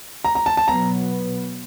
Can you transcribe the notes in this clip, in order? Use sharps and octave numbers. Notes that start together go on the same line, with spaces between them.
A#5
A#5
A5
A5
B2 F#3 B3 A#5